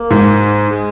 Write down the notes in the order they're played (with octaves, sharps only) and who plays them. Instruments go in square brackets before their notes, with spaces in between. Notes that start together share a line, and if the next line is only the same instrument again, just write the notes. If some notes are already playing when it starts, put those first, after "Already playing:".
Already playing: [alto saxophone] A#3
[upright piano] G#2
[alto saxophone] G#3